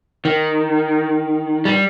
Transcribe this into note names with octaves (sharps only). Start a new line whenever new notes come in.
D#3
G3